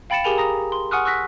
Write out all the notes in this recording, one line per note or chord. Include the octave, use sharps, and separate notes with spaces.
F5 G5 B5 A6 C#7 E7
G4 G#4 A#4 G#5 B5 F7
A#5 D#6 A#6
C6
F#5 G#5 C#6 D#6 F6 F#6
C#6 E6 F#6 A#6 B6